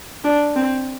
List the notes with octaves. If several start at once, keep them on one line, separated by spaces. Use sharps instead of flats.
D4
C4